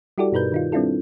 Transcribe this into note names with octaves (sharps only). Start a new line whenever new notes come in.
G3 E4 F#4 G4 A4 D5
G2 B2 D#4 A#4 B4 G6
D#3 D#4 F4
G3 C4 D4 E4 F4 A4